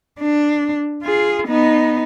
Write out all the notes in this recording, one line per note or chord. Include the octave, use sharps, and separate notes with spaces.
D4
F4 G#4
B3 D#4